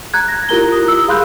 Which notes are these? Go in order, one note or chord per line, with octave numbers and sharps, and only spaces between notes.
A#5 F#6 G#6
A#6
E4 F4 G4 A#4 A#5 G7
D#6
E6
G#4 F5 B5 C6 F#6 G6